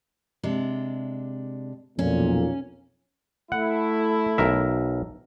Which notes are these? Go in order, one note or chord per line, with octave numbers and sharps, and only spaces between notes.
C3 G#3 D4
B1 F2 A#2 C#4
A3 E4 F#5
B1 A#4 E5